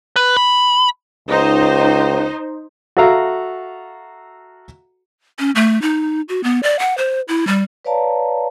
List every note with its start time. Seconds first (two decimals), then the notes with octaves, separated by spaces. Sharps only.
0.16 B4
0.37 B5
1.29 C#2 D#4 C5
2.97 F#4 A4 E5 F5 A#5
5.39 C#4
5.55 A3
5.82 D#4
6.29 F#4
6.44 B3
6.63 D5
6.79 F#5
6.98 C5
7.28 E4
7.47 G3
7.85 B4 C#5 D5 F5 A5 A#5